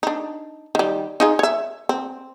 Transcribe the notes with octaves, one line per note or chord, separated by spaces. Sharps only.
D4 D#4
D#3 G3
D#4 F4 G#4
C#5 E5
C4